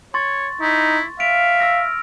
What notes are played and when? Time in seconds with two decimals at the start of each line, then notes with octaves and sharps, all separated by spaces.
0.14 C#5 C6 C#6 A6
0.61 D#4 E4
1.20 E5 F5 D7 F7
1.60 E6 F6 A#6